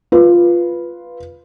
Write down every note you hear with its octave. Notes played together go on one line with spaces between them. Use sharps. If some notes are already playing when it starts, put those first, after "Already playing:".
F4 B4